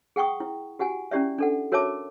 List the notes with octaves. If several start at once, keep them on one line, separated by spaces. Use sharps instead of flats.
G#4 F#5 G5 C#6 D#6
E4
F#4 G4 F#5 G#5
C#4 E4 G4 D5 E5
D4 A4 F#5
F#4 A#4 C#5 E5 A5 D6